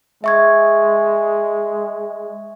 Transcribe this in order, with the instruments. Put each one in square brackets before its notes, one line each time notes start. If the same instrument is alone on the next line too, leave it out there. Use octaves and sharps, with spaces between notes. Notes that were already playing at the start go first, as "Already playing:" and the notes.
[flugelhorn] G#3 [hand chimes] E5 C#6 G#6